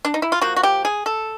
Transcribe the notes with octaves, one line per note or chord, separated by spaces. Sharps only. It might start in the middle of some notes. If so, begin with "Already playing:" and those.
D4
D#4
E4
F4
F3 A#3 F#4
F#4
G4
G#4
A4